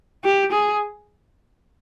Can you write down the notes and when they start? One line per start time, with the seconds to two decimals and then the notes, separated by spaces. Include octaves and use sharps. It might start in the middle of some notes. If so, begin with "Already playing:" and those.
0.24 G4
0.52 G#4